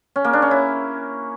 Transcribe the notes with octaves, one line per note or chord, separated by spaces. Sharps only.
C#4
A#3
D4
C#4
E4